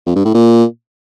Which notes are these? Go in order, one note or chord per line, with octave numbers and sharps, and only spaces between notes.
F2
G2
A2
A#2